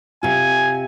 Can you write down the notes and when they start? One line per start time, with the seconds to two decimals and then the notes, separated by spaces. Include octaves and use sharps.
0.23 C3 F4 G#5